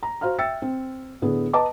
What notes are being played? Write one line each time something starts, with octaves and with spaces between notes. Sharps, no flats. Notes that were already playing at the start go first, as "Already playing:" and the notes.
A#5
F#4 C5 F5 A#5 F6
E5 G5 E6 A6 C#7
C4
A2 D3 B3 G#4
B4 D#5 A5 A#5 D6